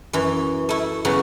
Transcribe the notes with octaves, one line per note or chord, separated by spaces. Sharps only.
F#2 E3
A3 E4
C#3 F#3 B3